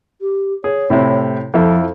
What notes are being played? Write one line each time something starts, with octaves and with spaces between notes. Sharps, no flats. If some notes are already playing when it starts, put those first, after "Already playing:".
G4
G#4 C#5
A2 C3 E4
F2 F3 E4 A4